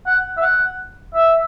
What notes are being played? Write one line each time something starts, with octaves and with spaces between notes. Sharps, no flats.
F#5
E5
F#5
E5